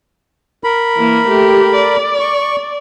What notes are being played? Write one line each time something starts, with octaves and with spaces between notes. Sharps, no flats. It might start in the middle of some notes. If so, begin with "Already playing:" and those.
A#4 B5
E3 A#3
A3 G4
D5
C#6